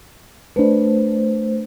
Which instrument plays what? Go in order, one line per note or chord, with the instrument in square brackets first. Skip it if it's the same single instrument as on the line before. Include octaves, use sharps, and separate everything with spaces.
[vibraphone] A3 C5 [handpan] D4 B4